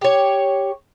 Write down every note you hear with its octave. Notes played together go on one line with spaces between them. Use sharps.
G4 C#5